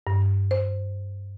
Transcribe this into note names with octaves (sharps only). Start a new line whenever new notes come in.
G2
C5